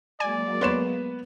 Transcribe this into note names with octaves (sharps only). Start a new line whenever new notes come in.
F#3 G#3 A#3 D5 G#5
B3 B4 C#5 C6 E7